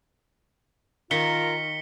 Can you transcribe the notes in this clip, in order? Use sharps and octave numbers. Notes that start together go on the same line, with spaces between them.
D#3 F4 A#4 B6 C#7 G7